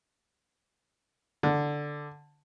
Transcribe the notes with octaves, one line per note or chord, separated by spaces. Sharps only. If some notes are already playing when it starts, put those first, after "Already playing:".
D3